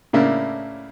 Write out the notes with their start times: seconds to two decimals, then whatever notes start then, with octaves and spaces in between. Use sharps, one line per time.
0.13 A2 C#3 A#3 D4 E4